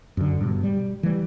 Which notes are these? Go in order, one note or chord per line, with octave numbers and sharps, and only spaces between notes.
F#2 D3
G2 B2
G3
E3 G3